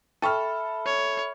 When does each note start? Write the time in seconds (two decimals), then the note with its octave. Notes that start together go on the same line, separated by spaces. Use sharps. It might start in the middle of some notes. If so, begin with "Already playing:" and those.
0.22 A4 E5 G5 B5 C#6 F6
0.86 C#5